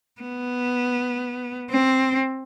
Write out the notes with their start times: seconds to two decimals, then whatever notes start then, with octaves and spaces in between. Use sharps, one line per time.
0.21 B3
1.70 C4